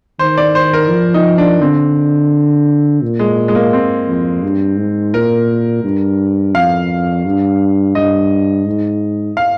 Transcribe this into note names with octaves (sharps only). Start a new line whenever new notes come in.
D#3 C5
D5
C5
A#4
F3
D#4
D4
D3 C4
A#2
G#3
G#3
A#3
C4
F2
G2
G#2
A#2 A#4
G2
F2 F5
G2
G2 D#5
G#2
F5